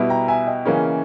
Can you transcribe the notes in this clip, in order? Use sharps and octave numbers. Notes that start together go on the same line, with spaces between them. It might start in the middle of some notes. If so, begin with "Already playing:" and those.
Already playing: B2 G3 B3 E4
G5 A#5
E5 G#5
D#5 G5
C#3 E3 A#3 C#4